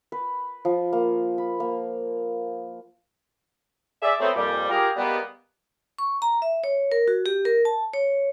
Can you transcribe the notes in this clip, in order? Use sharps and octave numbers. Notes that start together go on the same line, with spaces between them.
B4
F3
A#3
B5
A#3
G#4 D5 E5
F#3 A3 B3 C4
F2 A#2 G3
F4 G4 G#4 A#4
G3 G#3 A#3 B3
C#6
A#5
E5
C#5
A#4
F#4
G4
A#4
A5
C#5